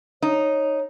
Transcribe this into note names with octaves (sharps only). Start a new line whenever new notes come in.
D#4 C#5